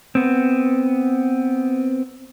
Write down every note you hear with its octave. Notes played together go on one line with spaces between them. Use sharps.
B3 C4